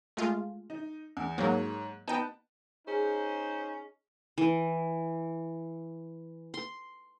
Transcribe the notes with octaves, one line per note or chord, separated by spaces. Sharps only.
G#3 A3 F4
D#4
E2
G#2 F#3 A#3 C#5
B3 D#4 G5 A5
C#4 D#4 G#4 C5
E3
C6